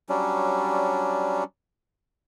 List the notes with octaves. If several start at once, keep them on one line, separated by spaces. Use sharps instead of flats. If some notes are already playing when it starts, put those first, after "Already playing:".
F#3 G3 C#4 D4